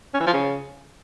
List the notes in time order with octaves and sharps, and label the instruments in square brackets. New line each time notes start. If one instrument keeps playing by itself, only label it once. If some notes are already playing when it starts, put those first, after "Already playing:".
[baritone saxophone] C#4
E3
F3
C#3